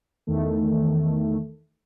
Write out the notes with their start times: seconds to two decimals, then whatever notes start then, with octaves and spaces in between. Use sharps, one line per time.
0.27 E2 D#3 A3